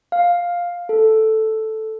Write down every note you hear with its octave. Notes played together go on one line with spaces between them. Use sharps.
F5
A4